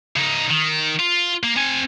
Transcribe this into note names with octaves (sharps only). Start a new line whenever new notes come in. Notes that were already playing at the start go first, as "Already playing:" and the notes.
C#3 D#4
D#3
F4
A#3
C4 G#5